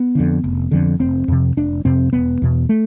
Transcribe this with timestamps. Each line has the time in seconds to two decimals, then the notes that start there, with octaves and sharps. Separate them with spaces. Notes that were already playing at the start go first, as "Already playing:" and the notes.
Already playing: B3
0.15 F2 D3
0.44 F1
0.71 F2 D3
1.00 F1 C4
1.28 F2 C3
1.57 F1 D4
1.85 F2 C3 C4
2.13 E1 B3
2.42 E2 B2
2.69 A3